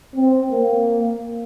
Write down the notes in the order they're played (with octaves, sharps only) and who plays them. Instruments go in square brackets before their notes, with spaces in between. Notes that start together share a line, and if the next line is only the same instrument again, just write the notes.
[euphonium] C4
A#3